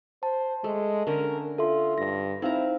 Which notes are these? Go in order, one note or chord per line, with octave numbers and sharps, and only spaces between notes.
C5 A5
G#3 A3
D3 C#4 A#4
F4 A4 E5 C6
G2 A#6
C4 D#4 E4 F5 A#5